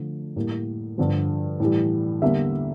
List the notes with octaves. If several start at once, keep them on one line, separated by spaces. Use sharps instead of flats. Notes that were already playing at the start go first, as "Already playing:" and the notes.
Already playing: D3 F3 A3
A2 G3 A#3
G2 D3 F3
A2 E3 G3
E2 D3 G3 A#3 E5